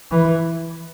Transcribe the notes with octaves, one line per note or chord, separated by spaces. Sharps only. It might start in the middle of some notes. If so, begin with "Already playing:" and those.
E3